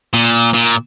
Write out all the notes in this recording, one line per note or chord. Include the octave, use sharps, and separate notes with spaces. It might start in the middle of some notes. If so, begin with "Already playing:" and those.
A#2
A#2